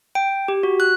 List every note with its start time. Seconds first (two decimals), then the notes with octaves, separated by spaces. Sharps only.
0.15 G5
0.48 G4
0.63 F#4
0.80 F#6